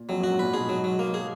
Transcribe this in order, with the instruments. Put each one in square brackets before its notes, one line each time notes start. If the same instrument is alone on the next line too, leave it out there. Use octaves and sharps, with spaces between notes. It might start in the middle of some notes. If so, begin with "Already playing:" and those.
Already playing: [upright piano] A#2
[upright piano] F2 [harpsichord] F#3
[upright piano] F#2 [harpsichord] F#4
[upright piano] G#2
[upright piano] A#2 [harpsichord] B4
[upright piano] G#2 B2 [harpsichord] G#4
[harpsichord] F#3
F#3
A#3
G#4